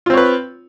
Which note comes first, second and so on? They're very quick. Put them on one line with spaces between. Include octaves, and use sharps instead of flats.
F4 C4 C#5 B4